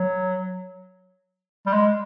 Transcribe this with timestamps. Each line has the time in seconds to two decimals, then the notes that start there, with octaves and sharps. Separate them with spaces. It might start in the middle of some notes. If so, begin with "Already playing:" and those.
Already playing: F#3
1.67 G3
1.73 G#3